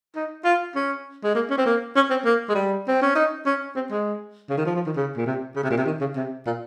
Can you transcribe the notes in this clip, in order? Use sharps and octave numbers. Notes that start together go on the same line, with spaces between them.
D#4
F4
C#4
G#3
A#3
C#4
C4
A#3
C#4
C4
A#3
G#3
G3
C4
C#4
D#4
C#4
C4
G#3
C#3
D#3
F3
F3
D#3
C#3
A#2
C3
C#3
C3
A#2
C3
D#3
C#3
C3
A#2